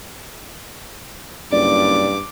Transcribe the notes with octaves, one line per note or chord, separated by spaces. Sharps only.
F#1 G2 D5 D6